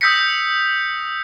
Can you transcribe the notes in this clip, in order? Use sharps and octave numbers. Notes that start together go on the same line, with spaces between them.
D#6 E6 G6 A#6 B6 C#7